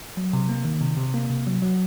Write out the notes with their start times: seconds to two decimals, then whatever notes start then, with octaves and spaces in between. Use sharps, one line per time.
0.17 F#3
0.33 C3
0.49 A#3
0.65 D#3
0.81 C3
0.97 C3
1.14 A#3
1.30 C3
1.47 F#3
1.62 F#3